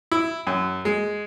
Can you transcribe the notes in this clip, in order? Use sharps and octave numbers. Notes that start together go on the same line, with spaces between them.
E4
F#2
G#3